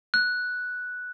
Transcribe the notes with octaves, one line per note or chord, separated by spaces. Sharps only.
F#6